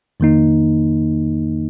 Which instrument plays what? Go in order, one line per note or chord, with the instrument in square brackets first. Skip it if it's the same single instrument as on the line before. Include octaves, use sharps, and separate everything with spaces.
[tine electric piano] F2 D#3 A#3 D#4